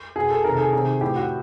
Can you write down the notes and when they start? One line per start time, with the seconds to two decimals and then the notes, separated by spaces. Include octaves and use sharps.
0.16 B2 G#4
0.30 A4
0.44 C3 D#3 A#4
0.54 A4
0.58 G#4
0.73 C3 D#3
1.01 A2 E3 G4
1.16 F#4